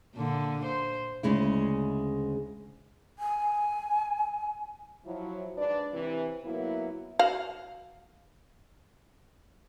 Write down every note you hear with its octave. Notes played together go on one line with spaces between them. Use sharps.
A#2 D3
C5
D2 C#3 G#3 E4
G#5
F3 F#3 E4
G#2 D4 B4 D5
C3 E3 B4
F#3 A#3 B3 E4
F#4 F5